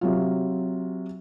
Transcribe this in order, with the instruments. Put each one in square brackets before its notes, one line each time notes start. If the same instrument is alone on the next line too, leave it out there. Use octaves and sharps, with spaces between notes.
[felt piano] C3 F#3 F4